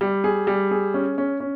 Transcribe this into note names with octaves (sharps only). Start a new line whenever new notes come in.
G3
G#4
G3
G#4
C#4
C#4
C#4